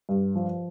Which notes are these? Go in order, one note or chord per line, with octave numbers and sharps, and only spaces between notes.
G2
F3